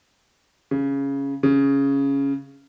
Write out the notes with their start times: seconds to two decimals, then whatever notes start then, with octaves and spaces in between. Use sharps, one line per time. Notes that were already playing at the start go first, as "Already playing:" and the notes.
0.71 C#3
1.43 C#3